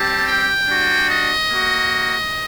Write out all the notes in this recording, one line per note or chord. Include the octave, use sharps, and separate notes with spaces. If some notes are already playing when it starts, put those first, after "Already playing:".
Already playing: G3 C4 G4 A5
G5
G3 D4 F#4
D#5
A#3 F#4